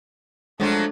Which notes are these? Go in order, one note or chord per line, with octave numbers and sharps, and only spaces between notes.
F3 F#3 G#3 A3 D4 F4